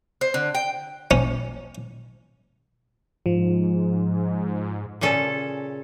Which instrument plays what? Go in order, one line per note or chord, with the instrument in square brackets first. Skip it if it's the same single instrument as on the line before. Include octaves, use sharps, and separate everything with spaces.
[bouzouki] C5
D3
G5
[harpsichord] C#4
[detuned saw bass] G#2 [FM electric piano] F3
[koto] A#2 C#3 C#4 A4